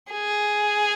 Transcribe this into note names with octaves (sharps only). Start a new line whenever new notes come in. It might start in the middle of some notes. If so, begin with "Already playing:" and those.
G#4